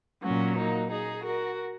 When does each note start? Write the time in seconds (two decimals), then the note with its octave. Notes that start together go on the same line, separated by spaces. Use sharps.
0.22 A#2 F#3 C#4 F#4
0.56 A#3 D#4
0.90 D#4 G#4
1.24 F#4 A#4